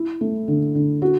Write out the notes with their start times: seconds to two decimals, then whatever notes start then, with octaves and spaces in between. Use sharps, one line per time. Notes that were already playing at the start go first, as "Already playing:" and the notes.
Already playing: E4
0.21 A3
0.48 D3
0.75 D3
1.02 F#4